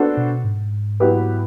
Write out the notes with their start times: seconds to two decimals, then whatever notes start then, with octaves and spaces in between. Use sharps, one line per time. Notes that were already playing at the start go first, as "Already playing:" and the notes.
Already playing: B3 D4 F#4 A4 C5
0.17 B2
0.44 G#2
1.00 F#3 B3 E4 G4 B4